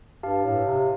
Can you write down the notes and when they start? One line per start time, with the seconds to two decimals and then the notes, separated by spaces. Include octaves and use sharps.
0.23 G2 G4 F5 A5
0.44 A2
0.65 C3